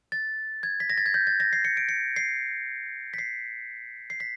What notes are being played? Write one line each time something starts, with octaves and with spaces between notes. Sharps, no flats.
A6
G#6
B6
A#6
A6
G#6
G6
A6
A#6
C7
C#7
D7
C#7
C7
B6
C7
C7
B6